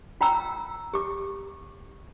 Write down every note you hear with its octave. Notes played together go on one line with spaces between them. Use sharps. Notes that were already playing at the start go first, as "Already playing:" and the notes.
F4 G5 A#5 E6
G4 D6